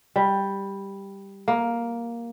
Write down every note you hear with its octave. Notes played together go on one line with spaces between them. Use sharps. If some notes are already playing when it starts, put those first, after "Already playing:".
G3
A#3